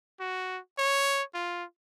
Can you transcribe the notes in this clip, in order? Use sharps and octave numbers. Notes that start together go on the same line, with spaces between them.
F#4
C#5
F4